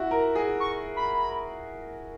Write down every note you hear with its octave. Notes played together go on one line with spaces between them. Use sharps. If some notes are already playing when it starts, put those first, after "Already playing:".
Already playing: E4 F#4
A#4
G#4
C#6
B5